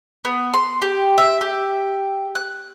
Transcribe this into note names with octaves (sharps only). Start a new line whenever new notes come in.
B3
C6
G4
E5
G4
F#6